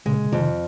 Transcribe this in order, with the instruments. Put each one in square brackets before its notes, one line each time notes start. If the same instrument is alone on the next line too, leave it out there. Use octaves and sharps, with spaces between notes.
[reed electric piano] A#2 C#3 [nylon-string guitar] G#3
[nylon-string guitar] F2 [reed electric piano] C3 D#3